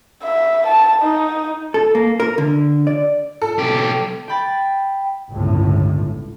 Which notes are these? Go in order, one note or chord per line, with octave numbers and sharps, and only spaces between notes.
E5
A5
D#4
A4
A#3
A#4
D3
D5
A4
B1 G4
G5 B5 A6
G1 C#2 A2